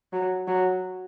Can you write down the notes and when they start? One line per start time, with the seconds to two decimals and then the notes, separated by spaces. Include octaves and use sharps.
0.13 F#3
0.47 F#3